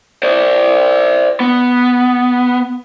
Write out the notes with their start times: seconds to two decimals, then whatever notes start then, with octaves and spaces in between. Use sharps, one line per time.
0.23 C5 D5
1.40 B3